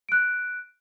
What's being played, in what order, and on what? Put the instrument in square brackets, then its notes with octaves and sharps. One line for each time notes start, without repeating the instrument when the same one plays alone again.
[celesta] F#6 D7